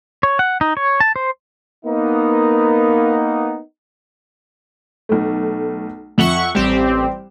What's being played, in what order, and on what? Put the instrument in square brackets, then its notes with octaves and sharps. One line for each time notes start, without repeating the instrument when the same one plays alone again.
[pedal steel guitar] C#5
F#5
D#4
C#5
A5
C5
[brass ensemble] A#3 B3 D#4
[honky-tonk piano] B1 A3
[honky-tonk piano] F2 F#7 [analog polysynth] E5 F#5 C#6
[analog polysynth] A1 C4 G4 [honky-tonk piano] G3 E7